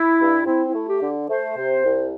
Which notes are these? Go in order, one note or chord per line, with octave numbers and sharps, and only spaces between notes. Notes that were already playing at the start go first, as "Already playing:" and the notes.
Already playing: E4
G2
C4 E4
E4
A3
G4
D3
A3 C5
C3
C2